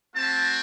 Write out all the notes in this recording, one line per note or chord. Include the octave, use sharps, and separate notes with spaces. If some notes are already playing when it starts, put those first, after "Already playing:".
A3 C4 F#4 A5